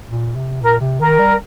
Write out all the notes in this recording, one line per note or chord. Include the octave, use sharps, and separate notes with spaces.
A#2
C3
A#2 A#4
C3
D#3 A#4
G3